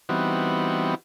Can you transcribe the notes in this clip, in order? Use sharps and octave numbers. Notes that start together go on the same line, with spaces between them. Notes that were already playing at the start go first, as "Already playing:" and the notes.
E3 G3 B3 C4 D#4 F#4